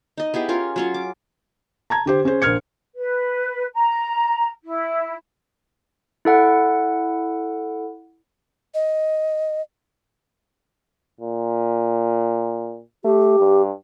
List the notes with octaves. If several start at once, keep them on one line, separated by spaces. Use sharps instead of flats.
D#4 D#5
B3 E4 G4 G#4
C#4 F4 A#4
F#3 C#4 F4
D6
A5 A#5 G#6
D3 G4 C5
C#4 G#4 C5
A#1 A#4 C5 F6 G#6 C#7
B4
A#5
E4
E4 A4 F#5
D#5
A#2
A3 G4
G2